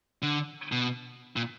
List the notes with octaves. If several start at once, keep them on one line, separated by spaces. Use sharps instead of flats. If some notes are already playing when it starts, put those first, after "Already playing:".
D3
B2
A#2